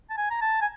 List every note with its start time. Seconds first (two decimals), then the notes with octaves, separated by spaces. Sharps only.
0.10 A5
0.17 G#5
0.30 A#5
0.41 A5
0.61 G#5